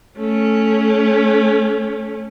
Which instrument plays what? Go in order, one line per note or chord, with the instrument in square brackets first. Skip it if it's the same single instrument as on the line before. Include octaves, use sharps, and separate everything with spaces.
[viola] A3 C#4